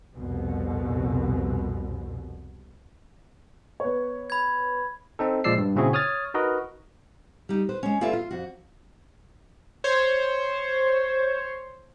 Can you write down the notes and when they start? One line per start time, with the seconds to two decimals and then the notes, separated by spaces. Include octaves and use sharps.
0.16 C2 F2 B2
3.80 B3 C#5
4.30 B5 G#6
5.19 C4 D#4 A4
5.44 A#2 F3 G#3 D5 E6 C7
5.58 G2
5.76 A#2 C#3 C4 E4 F#4 G#4
5.93 C#5 D#6 F6 A6
6.34 D#4 F#4 A#4 B4 D#5
7.49 G3 D#4
7.69 B4 C5
7.83 G#3 C#4
8.01 A#3 F4 A4 B4 D5 E5
8.13 F4
8.31 F2 F#4
9.84 C5 C#5